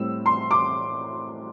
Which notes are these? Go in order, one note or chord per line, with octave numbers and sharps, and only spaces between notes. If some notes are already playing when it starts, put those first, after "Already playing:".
Already playing: A2 G3 C4 E6
C6
D6